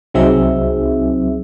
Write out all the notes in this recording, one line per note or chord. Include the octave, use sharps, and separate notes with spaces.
C2 F#3 C4 D#4 G#4 E5